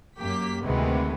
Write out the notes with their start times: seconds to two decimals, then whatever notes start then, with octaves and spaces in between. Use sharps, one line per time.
0.20 F#2 A#3 G4 B6
0.65 D2 C3 D#3 E3 G#3 B3